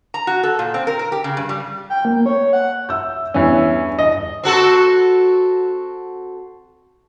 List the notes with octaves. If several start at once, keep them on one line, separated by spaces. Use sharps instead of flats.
A#5
F#4
A4
A#2
C4
A#4
A#4
G4
C#3
G2
G3
G5
A#3
C#5
F#5
E5 E6 G6
E2 G2 E3 C#4
D#5
C4 F#4 A4